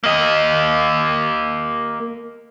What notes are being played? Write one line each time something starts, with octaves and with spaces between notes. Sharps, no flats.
A#3 D#5